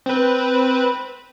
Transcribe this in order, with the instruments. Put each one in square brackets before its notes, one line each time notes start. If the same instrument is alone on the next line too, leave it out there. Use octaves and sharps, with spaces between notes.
[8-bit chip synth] C4 B4